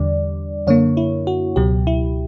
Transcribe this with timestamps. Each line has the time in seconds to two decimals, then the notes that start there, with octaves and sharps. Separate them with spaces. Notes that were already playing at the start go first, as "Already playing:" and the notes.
Already playing: E2 D3 G3 D5
0.67 F#2 D3 A#3 C#5
0.97 E4
1.27 F#4
1.56 C#2 B2 F#3 G4
1.87 E4